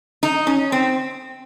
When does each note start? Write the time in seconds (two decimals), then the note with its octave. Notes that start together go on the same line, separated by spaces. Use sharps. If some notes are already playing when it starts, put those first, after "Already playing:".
0.23 D#4
0.47 C#4
0.72 C4